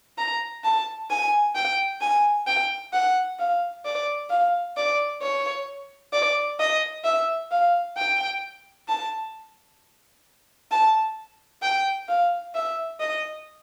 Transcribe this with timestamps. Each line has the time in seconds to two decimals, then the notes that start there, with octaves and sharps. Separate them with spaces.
0.18 A#5
0.64 A5
1.10 G#5
1.55 G5
2.01 G#5
2.47 G5
2.93 F#5
3.39 F5
3.85 D5
4.30 F5
4.76 D5
5.22 C#5
6.13 D5
6.59 D#5
7.04 E5
7.51 F5
7.97 G5
8.88 A5
10.71 A5
11.62 G5
12.08 F5
12.54 E5
13.00 D#5